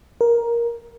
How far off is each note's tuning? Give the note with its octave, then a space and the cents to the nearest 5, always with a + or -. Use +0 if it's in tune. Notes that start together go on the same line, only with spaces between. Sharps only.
A#4 +10